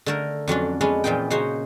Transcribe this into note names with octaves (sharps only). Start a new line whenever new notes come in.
D3 A3 A#4
F2 F#3 C#4 D4
G#3 B3 C#4 D4
A#2 E3 F3 D#4 G5
C#3 D#4 F#4 C5 C#5